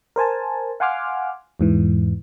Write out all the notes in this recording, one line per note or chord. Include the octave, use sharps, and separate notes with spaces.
A#4 C5 G#5 A5
F5 F#5 G#5 C6 D6 F6
E2 G#2 E3